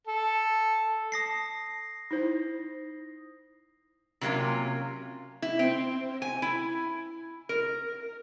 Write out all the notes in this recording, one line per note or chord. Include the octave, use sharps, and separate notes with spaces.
A4
A5 D#6 A#6 C7
D#4 E4 C5
C3 F#3 A#3 C4 C#4 F4
E4
C4
G#5
E4
A#4